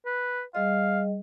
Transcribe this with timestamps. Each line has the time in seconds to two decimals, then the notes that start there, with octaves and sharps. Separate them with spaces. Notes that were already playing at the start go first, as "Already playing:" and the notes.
0.05 B4
0.55 G3 G#4 D#5 F5